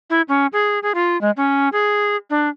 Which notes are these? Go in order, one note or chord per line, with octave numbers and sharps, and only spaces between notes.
E4
C#4
G#4
G#4
F4
G#3
C#4
G#4
D4